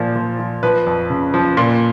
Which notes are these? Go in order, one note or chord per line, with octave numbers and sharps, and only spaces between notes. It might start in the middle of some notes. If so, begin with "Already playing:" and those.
Already playing: A#2 F3
F3
F3
F3 B4
F2
C#3
F3
A#2